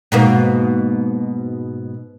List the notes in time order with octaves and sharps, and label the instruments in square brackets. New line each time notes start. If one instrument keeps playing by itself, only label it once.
[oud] G#2 B2 A#3